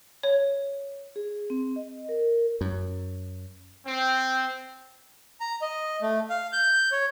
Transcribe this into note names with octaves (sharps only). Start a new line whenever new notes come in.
C#5
G#4
C4
D#5
A#4
F#2
C4
A#5
D#5
A3
F5
G6
C#5